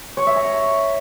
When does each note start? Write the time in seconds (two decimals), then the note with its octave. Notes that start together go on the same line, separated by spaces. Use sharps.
0.17 C#5
0.27 E5
0.37 A#5